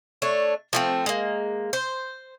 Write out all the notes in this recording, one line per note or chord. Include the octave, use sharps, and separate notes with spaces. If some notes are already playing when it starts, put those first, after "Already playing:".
A3 D4 C#5
F3 A3 C4
G#3 A#3
C5